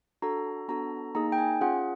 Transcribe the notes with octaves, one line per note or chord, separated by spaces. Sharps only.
D4 F#4 A4 A#5
B3 D4 F#4 A4 A#5
A#3 D#4 G#4 A#5
G5
G#5
C#4 F4 G#4 F#5